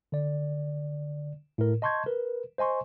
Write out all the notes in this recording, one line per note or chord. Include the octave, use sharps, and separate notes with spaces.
D3 D5
A2 A#4
D#5 A5 C6 C#6 G6 G#6
A#4 B4
C5 D#5 G#5 C6 C#6